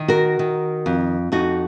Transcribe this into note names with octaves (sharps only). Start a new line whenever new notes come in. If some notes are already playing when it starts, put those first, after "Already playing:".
Already playing: D#3
F#4 A#4
D#3
F2
F2 D#4 F#4